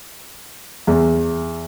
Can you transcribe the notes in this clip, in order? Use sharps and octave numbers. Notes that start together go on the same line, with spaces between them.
E2